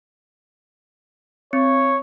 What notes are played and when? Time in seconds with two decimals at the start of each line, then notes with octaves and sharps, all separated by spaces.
1.53 C4 C#5